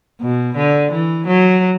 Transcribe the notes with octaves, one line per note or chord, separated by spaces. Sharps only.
B2
D3
E3
F#3